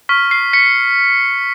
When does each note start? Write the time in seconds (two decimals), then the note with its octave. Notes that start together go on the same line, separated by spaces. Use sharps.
0.09 C#6 F6 B6
0.31 C7
0.53 B6 C#7